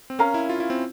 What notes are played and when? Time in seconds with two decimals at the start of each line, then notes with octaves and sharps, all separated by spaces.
0.10 C4
0.19 C#4 A#4 F5 A#5
0.34 E4
0.49 F4
0.60 E4
0.70 C4